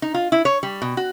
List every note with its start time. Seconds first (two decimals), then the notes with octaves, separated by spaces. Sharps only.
0.02 D#4
0.14 F4
0.32 E4
0.45 C#5
0.63 G3
0.82 B2
0.97 F#4